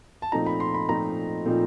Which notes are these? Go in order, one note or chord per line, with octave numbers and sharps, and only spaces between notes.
A5
A#2 F3 A3 C4 D#4 A#5
B5
C6
B5
A#2 F3 A3 C4 D#4 A#5
A#2 F3 A3 C4 D#4